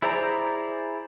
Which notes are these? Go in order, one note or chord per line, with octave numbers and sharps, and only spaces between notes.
E4 G#4 C5 D5 A#5